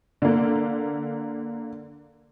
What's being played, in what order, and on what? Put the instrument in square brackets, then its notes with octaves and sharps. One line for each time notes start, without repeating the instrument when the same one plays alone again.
[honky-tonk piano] D3 A#3